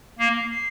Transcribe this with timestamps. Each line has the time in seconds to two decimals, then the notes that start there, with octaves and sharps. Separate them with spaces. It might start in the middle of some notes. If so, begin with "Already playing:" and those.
0.19 A#3 C7
0.50 C7